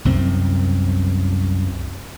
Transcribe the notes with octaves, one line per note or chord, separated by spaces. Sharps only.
C2 F#2 C4